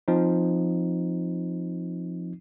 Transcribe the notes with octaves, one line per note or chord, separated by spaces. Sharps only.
F3 C4 D#4